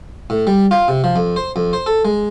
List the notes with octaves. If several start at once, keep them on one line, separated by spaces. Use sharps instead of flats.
A2
G3
F4
C3
F3
F2
C5
F2
C5
A4
G#3